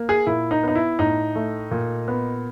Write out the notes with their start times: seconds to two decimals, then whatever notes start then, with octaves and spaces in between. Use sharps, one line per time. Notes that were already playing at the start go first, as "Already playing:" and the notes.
Already playing: A#3
0.09 G#4
0.26 A#2 E4
0.51 D#4
0.63 B3 D#4
0.75 E4
0.99 A2 D#4
1.35 A3
1.71 A#2
2.08 B3